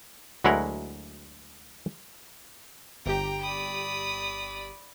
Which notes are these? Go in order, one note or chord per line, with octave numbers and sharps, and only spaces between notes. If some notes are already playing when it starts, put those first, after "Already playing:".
D2 F#3 G#3 E4 A#4 F#5
G1 G4 G5 A#5
D5 B5 D#6